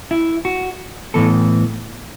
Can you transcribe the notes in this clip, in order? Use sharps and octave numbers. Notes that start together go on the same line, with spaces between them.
E4
F#4
A2 E3 B3 A4